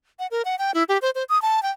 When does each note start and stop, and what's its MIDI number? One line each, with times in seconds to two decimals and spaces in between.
0.19 0.27 78
0.31 0.42 70
0.45 0.56 78
0.59 0.72 79
0.74 0.83 64
0.89 0.98 67
1.02 1.10 72
1.15 1.24 72
1.29 1.41 87
1.42 1.62 81
1.63 1.71 79